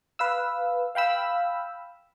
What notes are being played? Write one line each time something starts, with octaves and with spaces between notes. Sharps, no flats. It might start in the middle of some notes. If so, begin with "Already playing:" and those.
B4 F5 E6
F5 G5 B5 E6